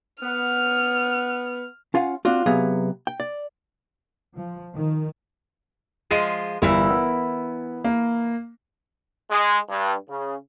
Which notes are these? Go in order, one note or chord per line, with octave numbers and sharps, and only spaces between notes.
B3 F6
C#4 F4 F5 F#5 G#5
C4 D4 F4 F#4
C3 F#3 B3 G#4 F5
G5
D5
F3
D#3
F3 G#3 F4 D#7
G1 E3 E4 A#4
B3
A#3
G#3
G2
C#3